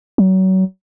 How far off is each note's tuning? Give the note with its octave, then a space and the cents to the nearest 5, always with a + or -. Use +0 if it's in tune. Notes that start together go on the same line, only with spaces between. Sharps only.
F#3 +30